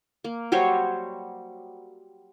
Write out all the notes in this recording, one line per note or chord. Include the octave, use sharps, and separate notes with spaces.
A#3
F#3 G3 C5 C#5